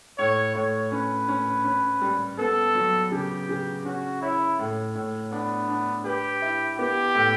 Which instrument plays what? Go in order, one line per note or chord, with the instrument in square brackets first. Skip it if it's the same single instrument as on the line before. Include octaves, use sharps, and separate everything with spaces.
[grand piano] A2 [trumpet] C#5
[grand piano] A2 [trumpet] C#5
[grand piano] C#4 [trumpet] B4
[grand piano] C#4
C#4
G3
[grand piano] B3 [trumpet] A4
[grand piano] F#3
[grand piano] C#3 [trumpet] G4
[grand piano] C#3
[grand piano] C#4 [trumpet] F#4
[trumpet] E4 [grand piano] C#5
[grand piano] A2
A2
[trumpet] B3 [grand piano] D4
[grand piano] D4
[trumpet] G4 [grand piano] B4
[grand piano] E4
[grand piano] B3 [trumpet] G4
[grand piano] A2